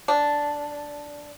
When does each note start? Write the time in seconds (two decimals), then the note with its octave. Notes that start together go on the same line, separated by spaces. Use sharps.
0.08 D4